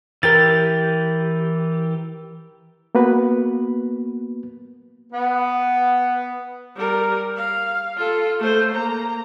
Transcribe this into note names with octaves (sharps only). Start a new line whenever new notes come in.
E3 G4 A#4 A6
A#3 B3 F#4 B4
B3
G3 A#4
F5
F4 A4
A3 C5
A#3 A#5